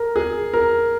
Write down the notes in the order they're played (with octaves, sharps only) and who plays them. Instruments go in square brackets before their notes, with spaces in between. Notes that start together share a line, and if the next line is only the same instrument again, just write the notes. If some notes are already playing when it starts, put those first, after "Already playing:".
Already playing: [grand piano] A#4
G#4
A#4